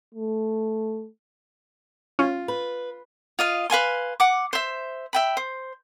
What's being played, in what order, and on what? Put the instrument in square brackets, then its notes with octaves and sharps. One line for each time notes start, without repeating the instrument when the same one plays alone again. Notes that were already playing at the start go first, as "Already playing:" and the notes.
[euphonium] A3
[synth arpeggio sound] C#4 [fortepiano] F4
[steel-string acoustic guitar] B4
[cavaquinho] F4 D#5 F5
B4 F5 G#5 C6
F#5 D6
C5 E5
E5 G5 B5
C5